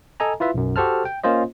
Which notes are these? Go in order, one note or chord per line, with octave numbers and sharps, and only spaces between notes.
A4 D#5 G#5 A#5
E4 F4 B4 E5
B1 F#2
F#4 G4 A4 C5 A5 F6
G5
A#3 C#4 F4 C5 D#5